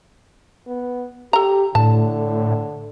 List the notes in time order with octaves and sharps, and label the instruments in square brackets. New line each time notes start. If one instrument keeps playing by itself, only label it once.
[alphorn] B3
[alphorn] G4 [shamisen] A4 A#5
[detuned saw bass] A2 [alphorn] D3 [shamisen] A5